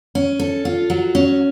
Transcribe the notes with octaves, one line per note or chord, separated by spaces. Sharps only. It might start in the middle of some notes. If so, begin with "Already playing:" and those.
C#4
A4
F4
F#3
C#4